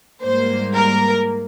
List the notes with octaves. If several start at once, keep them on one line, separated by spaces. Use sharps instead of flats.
G#2 G3 A#3 C5
A#4